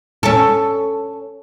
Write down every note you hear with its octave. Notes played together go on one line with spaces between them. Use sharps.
C#4 A4